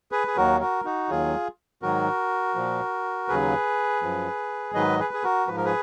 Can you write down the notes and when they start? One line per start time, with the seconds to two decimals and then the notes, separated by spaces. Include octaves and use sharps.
0.12 G#4 B4
0.27 G#4
0.36 D#2 D#3 F#3 F#4 A#4
0.60 F#4 A#4
0.85 D#4 F#4
1.09 D#2 D#3 F#3 F4 G#4
1.82 G#2 D#3 F#3 F#4 A#4
2.55 A#2 F3
3.28 D#2 C#3 F#3 G#4 B4
4.02 F#2 F3
4.74 G#2 D#3 F#3 B4 D#5
4.99 G#4 B4
5.14 G#4
5.23 F#4 A#4
5.47 G#2 F3 B4
5.57 A#4
5.65 G#4 B4